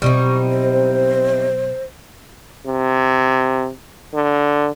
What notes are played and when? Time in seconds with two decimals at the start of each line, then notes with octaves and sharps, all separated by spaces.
0.02 B2 F#3 G3 C4 D#4 E4 C#6
0.51 C5
2.67 C3
4.14 D3